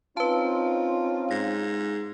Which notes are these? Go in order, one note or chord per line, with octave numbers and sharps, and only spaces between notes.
C4 C#4 D#4 F4 B4 A5
G#2 A#6